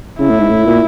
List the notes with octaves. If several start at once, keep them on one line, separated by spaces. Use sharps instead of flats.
C#3 E4
A2
G#2
A2
A#2